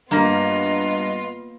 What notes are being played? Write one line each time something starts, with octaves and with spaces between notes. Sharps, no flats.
G2 A#3 B3 F4 D#5 A#5 A#6